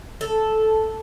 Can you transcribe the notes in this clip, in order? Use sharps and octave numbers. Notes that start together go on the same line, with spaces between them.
A4